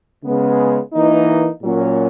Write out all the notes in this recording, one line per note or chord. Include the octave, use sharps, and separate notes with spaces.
C#3 G#3 B3
E3 A#3 D#4
A#2 F#3 C#4